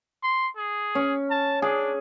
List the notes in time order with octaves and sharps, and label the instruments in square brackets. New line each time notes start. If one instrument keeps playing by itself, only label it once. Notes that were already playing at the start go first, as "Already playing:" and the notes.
[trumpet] C6
G#4
[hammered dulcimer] C#4
[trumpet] A5
[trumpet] D4 [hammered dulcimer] G#4